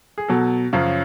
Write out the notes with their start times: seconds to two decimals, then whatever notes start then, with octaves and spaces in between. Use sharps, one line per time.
0.18 G#4
0.28 B2 F#3 A4
0.73 F#2 C#3 F3